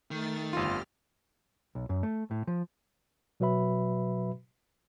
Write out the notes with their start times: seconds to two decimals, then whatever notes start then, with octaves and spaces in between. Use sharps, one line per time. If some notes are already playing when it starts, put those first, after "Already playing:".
0.11 D#3 A3 A6
0.53 G1 F2 F4 G4 F6
1.75 B1
1.89 F#2
2.03 A3
2.31 A2
2.47 F3
3.40 B2 F#3 F#4 B4 E5 B5